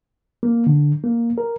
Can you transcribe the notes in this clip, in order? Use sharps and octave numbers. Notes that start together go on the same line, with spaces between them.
A#3
D3
A#3
A#4